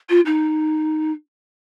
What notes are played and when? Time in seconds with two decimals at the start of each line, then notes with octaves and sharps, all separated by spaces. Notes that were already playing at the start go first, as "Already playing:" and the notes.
0.09 F4
0.25 D#4